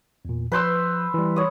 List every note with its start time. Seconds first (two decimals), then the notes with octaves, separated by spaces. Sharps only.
0.25 E2 A#2
0.52 F3 B4 C6 E6 G6
1.14 E3 G3
1.36 C#5 D#6